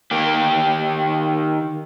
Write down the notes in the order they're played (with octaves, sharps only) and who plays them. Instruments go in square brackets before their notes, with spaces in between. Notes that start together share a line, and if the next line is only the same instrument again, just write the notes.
[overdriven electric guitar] D#3 G4